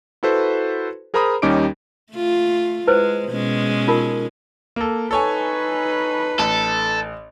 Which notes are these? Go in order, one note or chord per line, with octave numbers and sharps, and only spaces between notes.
E4 F#4 A4 B4 C5
G#4 A#4 C5 A#5 B5 D#6
D#2 G3 C#4 D#4 D6 D7
A3 F4
G#3 E4 B4 C5
B2 G#3 C#4
D#4 F4 A#4
A#3 A4
D#4 A4 B4 C#5 G#5
A1 A4